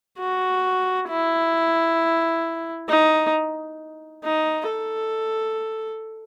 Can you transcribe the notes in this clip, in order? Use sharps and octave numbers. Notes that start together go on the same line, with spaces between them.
F#4
E4
D#4
D#4
A4